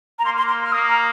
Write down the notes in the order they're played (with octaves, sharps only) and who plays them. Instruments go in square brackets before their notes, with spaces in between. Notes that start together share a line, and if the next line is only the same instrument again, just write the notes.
[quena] A#5
[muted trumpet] A#3 [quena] C6
[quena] C6
C6
F6
[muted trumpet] A#3 [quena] D#6
[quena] A#5